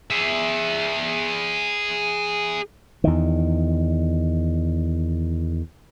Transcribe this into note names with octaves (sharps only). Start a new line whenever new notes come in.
G#4 E5
E2 D#3